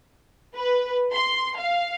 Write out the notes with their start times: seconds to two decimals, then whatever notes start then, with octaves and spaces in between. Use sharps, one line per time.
0.56 B4
1.12 C6
1.58 F5